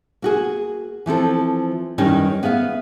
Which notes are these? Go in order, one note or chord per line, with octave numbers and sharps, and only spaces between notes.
A#3 F#4 G#4
E3 F3 C4 A4
F#2 D#3 E3 G3 C#4 D#4
B3 G#4 E5 F5